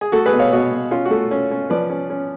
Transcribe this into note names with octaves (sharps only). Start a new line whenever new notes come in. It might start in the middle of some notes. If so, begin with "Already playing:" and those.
G#4
A3 F#4 A4
G#4 B4
B2
C#5 F5
B2 F#4
B2
C#4 F4
F#4
A3
C#4
C#4
F3 B4 D5
C#4
C#4